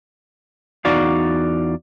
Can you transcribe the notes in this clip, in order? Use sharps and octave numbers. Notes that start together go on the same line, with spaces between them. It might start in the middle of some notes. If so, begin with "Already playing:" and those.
E2 D#4 F#4 D5 F5